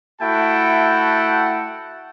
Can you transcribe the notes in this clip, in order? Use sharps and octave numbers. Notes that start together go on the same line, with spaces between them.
A3 E4 F#4 F#5 G5 A5